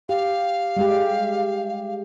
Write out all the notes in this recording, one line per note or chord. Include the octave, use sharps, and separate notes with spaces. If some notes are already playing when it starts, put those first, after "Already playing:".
G4 F5
G3 G#3 G4